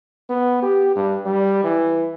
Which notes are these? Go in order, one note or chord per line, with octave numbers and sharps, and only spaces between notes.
B3
G4
G2
G3
E3